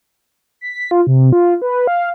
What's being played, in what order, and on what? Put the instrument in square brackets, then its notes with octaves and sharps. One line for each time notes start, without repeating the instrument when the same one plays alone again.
[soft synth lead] B6
F4
C3
F4
B4
F5